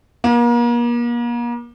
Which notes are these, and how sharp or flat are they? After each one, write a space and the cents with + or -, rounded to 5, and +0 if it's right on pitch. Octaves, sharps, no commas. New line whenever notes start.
A#3 +40